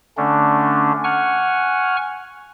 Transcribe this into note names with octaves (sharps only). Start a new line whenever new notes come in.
D3 A3 C#4 D4
F#5 G#5 C#6 F6